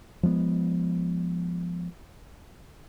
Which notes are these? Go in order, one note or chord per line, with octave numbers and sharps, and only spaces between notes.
F3 G#3 A#3 B3